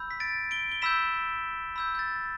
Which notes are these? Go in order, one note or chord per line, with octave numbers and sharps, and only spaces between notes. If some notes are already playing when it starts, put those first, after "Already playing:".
Already playing: B5 E6 G6
B6
A6 D7
D7 G7
G7
B5 E6 G6 B6 E7
B5 E6 G6
G6
A6